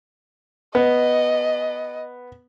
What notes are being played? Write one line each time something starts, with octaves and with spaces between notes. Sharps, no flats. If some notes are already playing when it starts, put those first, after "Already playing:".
B3 D#5